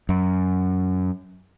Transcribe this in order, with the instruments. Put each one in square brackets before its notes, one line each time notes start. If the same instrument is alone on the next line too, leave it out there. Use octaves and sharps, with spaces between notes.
[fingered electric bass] F#2